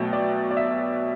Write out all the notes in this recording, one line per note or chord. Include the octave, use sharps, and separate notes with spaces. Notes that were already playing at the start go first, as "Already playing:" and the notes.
Already playing: B2 F#3 A3 G5
D5
D5
E5